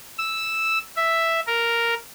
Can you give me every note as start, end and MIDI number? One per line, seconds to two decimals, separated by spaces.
0.18 0.78 88
0.96 1.40 76
1.47 1.94 70